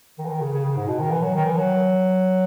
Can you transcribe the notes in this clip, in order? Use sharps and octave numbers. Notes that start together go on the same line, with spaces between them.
D#3
E3
D#3
C#3
C#3
C#3
G#2
B2
D#3
E3
F#3
D#3
E3
F#3